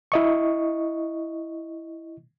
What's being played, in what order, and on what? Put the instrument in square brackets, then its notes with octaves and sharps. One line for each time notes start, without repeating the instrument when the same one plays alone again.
[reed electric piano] E4 D#5 C#6